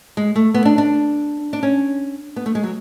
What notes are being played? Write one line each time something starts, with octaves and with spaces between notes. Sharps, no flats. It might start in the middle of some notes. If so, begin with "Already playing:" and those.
G#3
A3
B3
D4
D4
D4
C#4
B3
A3
G#3
F#3